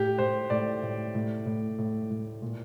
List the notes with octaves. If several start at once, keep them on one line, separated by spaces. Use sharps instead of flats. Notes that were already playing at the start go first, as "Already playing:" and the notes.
Already playing: A2 G4
A2 C5
A2 D5
A2
A2
A2
A2
A2
A#2